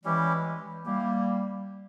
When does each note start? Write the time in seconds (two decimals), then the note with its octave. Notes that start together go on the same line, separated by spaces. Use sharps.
0.04 E3 G3 G#3 C#4 E4 G4
0.86 G3 A#3 E4 G4